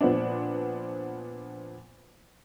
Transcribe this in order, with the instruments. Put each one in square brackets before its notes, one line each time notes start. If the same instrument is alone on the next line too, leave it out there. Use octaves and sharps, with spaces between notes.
[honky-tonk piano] A#2 F3 B3 C4 D4